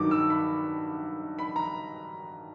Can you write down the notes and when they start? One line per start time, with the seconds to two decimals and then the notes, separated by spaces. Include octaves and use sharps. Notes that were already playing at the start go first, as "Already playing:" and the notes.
Already playing: G2 D#3 F#3 D6
0.11 E6
0.30 B5
1.39 B5
1.56 A#5